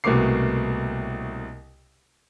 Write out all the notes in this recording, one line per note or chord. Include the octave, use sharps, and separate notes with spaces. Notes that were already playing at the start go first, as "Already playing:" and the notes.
C2 B2 A3 A#3 D6 C7